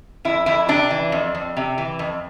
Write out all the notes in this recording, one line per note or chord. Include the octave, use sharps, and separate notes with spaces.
F2 E4
F2 E4
C3 D4
E3
F2
F2
C3
E3
F2